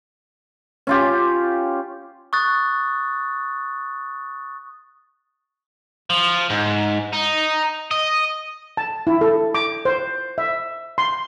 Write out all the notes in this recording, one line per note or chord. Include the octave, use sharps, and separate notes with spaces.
C#4 F4 G4
C#6 D#6 F#6 A6
F3
G#2
D#4
D#5
A5
E4
A4
D6
C5
E5
C6